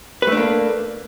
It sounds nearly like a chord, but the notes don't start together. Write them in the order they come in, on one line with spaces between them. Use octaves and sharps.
B4 A3 D4 A#3